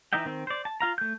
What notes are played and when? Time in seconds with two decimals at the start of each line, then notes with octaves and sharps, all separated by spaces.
0.13 E3 D#4 D#5 E5 G5
0.25 D#3 C4
0.47 C5 D5
0.65 A5
0.81 F4 F5 A#5
0.98 A3 G6